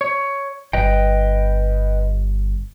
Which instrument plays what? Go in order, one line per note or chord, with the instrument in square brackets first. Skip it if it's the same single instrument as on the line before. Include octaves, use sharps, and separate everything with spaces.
[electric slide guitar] C#5
[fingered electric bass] G1 [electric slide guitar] B4 D#5 G5